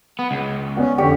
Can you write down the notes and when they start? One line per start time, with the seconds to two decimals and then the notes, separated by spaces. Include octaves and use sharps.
0.19 B3
0.31 C#2
0.77 B3 C#4 D5 F#5
0.98 F2 D3 G4 D5 C#6